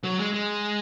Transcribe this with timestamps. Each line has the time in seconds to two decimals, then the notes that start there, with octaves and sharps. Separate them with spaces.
0.04 F#3
0.18 G#3
0.33 G#3